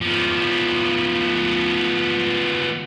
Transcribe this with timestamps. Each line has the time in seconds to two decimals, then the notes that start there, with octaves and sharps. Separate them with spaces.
0.01 F3 B3